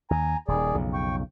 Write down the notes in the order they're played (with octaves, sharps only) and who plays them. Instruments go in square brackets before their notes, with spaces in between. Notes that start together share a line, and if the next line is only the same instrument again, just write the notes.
[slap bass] D#2 [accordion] G#5 A#5
[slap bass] D#1 [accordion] D#3 G#4 D5
[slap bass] B1 F2 C#3
[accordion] G5 C#6